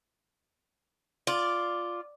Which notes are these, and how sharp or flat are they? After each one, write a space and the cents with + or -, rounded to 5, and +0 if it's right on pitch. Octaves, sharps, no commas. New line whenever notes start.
F4 +0 D5 +0